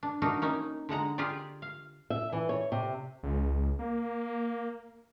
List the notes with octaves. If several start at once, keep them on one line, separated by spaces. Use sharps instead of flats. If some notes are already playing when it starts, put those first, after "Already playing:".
D4
A3 D4 D#4 F#4 A#4
A#3 C#4 D#4
D3 G#3 F#5 A#5
F4 G4 G#4 D5
F5
E5
E3
C#5
C3
C#2
A#3